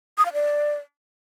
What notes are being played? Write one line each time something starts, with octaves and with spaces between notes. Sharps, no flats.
D#6
F5
D5